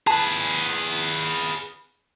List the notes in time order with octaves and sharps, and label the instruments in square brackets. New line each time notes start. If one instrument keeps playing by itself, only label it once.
[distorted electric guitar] G#4 B4 [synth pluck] A5